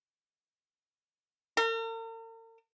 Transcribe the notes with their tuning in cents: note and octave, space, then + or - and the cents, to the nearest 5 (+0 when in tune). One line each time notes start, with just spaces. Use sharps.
A#4 -45